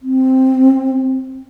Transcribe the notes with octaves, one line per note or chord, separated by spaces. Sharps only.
C4